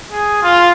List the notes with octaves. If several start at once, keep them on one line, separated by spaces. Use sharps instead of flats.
G#4
F4